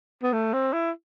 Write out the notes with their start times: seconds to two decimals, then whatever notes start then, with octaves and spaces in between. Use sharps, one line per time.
0.23 B3
0.33 A3
0.54 C4
0.73 E4